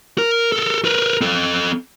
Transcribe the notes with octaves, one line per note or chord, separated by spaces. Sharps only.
A#4
A4 A#4
A#4 B4
C4 A4